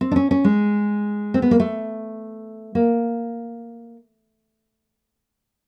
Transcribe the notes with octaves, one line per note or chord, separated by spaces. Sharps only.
C4
D4
C#4
C#4
G#3
C4
B3
A#3
A3
A#3